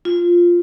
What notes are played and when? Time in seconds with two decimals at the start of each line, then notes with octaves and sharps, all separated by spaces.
0.05 F4